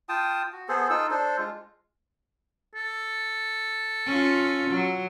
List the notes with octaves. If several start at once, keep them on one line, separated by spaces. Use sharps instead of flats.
F4 G5 A5 D#6
F#4
B3 G#4 A4 C5
D#4 F4 A4 E6
D4 A4 C5
G#3 F4
A4
C#4 F4
F#3